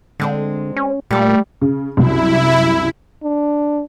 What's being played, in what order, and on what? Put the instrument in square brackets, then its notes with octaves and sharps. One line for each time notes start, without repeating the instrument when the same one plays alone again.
[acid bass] D3 [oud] G#3 C4 D4
[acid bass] C#4
[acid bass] A#2 [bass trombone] G3 [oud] A3 A4
[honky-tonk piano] C#3
[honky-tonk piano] C2 F#2 [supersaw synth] E4
[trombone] D4